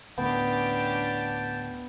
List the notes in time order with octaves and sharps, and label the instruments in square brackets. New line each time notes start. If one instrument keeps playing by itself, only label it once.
[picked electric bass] D2 A2 [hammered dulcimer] B3 [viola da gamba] C#4 D4 G4 [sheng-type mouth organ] G5 A5